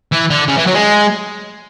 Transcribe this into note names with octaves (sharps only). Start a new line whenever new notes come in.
E3
D3
C#3
E3
F#3
G#3